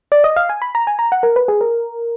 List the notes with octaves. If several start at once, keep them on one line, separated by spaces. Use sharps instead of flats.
D5
D#5
F5
G#5
B5
A#5
G#5
A#5
F#5
A#4
B4
G#4
A#4